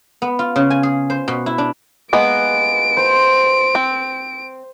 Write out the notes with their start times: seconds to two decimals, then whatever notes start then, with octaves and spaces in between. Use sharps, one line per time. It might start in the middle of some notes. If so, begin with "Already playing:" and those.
0.22 B3
0.39 F4
0.56 C#3
0.70 G#5
0.83 G#4
1.10 C5
1.28 B2
1.46 E4
1.58 D4
2.13 G#3 A#3 B3 D7
2.97 C5
3.75 C4